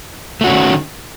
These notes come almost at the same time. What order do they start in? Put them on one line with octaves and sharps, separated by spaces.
A3 F#4 C#4 E3 D#3